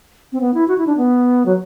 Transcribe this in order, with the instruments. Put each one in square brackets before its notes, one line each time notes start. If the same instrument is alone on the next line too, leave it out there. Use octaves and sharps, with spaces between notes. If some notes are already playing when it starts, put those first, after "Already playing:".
[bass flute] C4
B3
E4
F#4
E4
D4
B3
F#3